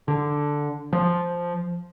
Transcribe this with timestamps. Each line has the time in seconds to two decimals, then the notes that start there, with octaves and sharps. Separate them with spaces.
0.08 D3
0.93 F3